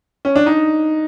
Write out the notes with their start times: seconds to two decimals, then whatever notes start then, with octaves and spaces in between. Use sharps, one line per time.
0.25 C#4
0.36 D4
0.46 D#4